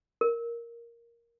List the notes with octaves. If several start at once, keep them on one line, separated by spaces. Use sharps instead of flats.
A#4